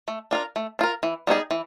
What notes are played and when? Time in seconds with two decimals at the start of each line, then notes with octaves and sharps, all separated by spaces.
0.08 A3
0.31 D4 F4 A#4
0.56 A3
0.79 D4 F4 A#4
1.03 E3
1.27 G3 B3 D#4 G#4
1.51 E3